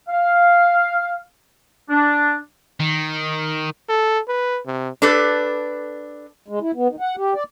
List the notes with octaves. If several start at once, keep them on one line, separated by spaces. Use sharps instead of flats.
F5
D4
D#3
A4
B4
C3
D4 G4 A4 B4
G#3
E4
B3
D#3
F#5
G4
D5